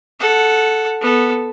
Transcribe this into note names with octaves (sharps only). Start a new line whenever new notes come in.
A4 F#5
B3 A4